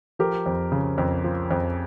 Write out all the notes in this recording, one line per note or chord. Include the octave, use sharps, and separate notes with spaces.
F3 G4 A#4
F2
C#3
F2
F3
F2